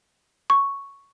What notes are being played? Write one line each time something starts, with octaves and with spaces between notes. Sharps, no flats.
C#6